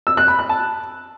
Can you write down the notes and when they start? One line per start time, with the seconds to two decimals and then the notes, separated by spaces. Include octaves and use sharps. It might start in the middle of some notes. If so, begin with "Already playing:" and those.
0.07 E6
0.17 F#6
0.28 B5
0.39 F#6
0.49 A5